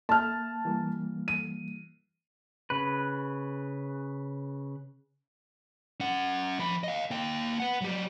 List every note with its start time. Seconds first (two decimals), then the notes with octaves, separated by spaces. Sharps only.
0.09 A#3 E5 A5 F6 G6
0.65 E3 G3 A#3
1.28 D#7
2.70 C#3 B4
6.00 C#4 F#5
6.59 F3 B5
6.84 D#5 F5
7.11 A#3 G5
7.60 B4 F#5
7.81 F#3 G4